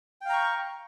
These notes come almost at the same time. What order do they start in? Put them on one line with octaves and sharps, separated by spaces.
G5 F5 A#5 C#6